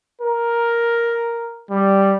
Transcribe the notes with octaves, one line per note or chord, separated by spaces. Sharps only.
A#4
G3